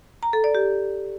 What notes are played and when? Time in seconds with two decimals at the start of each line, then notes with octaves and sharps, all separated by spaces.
0.23 A#5
0.33 A4
0.44 D5
0.55 G4